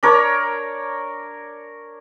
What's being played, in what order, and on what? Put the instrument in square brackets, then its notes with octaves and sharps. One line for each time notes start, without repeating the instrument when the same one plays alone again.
[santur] D4 A#4 C#5